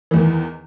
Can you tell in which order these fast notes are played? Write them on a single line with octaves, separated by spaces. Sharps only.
E3 E2 D#3